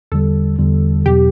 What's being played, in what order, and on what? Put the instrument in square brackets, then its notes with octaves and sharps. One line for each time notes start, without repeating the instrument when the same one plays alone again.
[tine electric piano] E2 D3 G3 [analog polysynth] A4
[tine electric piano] E2 D3 G3
[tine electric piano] E2 B2 F#3 [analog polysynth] G4